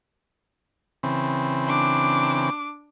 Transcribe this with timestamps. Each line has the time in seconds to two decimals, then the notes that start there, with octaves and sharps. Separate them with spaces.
1.03 C#3 E3 C4
1.67 D4 D6